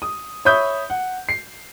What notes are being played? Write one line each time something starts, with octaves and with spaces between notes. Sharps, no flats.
D#6
C#5 E5 B5 D#6 G6
F#5
C7